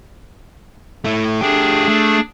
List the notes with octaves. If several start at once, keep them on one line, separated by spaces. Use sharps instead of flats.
A3 E4
A3 D4 G4 G#4
A3